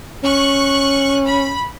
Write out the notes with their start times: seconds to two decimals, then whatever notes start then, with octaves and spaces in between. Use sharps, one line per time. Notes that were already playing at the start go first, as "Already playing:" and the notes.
0.23 C#4 C#6 F#6
1.25 B5